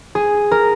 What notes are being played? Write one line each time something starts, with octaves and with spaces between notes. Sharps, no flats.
G#4
A#4